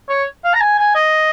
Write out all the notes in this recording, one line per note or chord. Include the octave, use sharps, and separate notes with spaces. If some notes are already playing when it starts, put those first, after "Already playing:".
C#5
F5
A#5
G#5
G#5
D#5